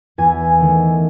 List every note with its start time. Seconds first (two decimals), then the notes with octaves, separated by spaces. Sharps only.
0.18 E2 G#5
0.60 D#3 A3